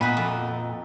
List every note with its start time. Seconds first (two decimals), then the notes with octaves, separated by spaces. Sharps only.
0.01 A#2 B3 D#4 F#4 E5 B5
0.17 F2